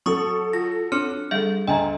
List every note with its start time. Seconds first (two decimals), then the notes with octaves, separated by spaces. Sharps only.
0.06 F#3 A4 C#6 D#6
0.53 F4 A#6
0.92 C4 D4 C#5 F6 C#7
1.31 G3 G#4 A4 E5
1.67 D2 D#5 E5 G5 G#5 A#5